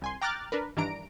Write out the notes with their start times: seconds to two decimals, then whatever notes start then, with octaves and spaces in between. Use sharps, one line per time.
0.02 C2 G#5 C6
0.22 G5 A#5 D6 F6 F#6 A6
0.52 D4 A#4 B4
0.77 G2 D#3 E3 D4 A#5 D7